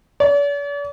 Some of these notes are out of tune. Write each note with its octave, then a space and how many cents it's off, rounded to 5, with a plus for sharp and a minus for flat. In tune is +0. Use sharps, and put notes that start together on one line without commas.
D5 -45